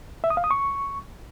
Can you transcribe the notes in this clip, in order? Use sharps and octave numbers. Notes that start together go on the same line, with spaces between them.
E5
D#6
F5
D#6
C#6